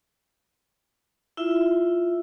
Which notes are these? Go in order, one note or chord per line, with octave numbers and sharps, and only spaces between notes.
E4 F4 E5